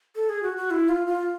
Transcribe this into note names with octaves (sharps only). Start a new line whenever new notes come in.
A4
G#4
F#4
F#4
E4
F4
F4